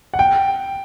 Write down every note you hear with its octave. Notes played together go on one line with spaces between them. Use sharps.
F#5
G5